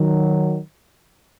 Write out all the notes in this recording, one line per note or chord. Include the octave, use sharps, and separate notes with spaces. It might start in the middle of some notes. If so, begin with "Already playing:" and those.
Already playing: D#3 F#3